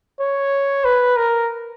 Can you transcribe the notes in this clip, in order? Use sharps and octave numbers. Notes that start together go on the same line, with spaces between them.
C#5
B4
A#4